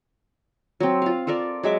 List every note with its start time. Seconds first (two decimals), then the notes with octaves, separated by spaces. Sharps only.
0.80 F#3 C4
1.02 F4 F5
1.27 F4 A4 A#4 D5
1.63 F#3 G#3 E5 D6